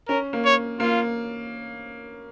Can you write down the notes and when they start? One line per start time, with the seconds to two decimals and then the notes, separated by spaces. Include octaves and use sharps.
0.08 C#4 A#4
0.33 A#3
0.45 C#5
0.80 A#3 F4